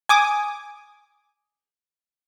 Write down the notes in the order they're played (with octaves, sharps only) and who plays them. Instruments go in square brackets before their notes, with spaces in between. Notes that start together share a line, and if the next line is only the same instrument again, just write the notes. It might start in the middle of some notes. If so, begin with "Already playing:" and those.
[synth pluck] G#5 D6 D#6